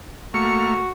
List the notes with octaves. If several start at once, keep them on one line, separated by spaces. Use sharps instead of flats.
A3 A#3 F#4 F6 C#7